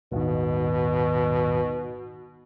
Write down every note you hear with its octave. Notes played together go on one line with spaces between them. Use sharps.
D#1 G#1 B2 D#3